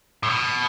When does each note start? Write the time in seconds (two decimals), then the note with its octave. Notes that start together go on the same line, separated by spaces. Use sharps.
0.23 A2
0.29 B2